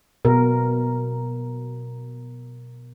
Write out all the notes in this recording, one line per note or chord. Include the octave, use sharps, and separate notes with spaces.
B2 A#4